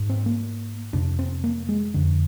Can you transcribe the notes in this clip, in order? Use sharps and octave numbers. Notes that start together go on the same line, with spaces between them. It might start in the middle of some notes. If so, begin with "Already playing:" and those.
Already playing: G#2
C4
A#3
F2 C3 D4
C4
A#3
G#3
F2 D3